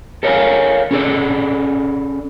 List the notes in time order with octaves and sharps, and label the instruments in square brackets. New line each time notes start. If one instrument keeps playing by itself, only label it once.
[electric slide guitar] A4 A#4 C#5 D5 F5 G#5
C#4 G#4 A4 D5